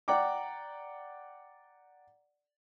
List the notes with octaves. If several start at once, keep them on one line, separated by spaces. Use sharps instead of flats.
D5 F#5 G5 A#5 D6